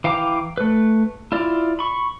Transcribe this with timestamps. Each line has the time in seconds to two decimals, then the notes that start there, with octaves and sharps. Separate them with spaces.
0.04 E3 F5 G5 A#5 D6
0.57 A3 B4
1.32 E4 F4 D5
1.79 B5 C#6